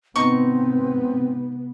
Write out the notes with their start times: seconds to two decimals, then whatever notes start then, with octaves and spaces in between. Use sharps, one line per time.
0.16 G#1 C3 B3 C4 D#4 C#6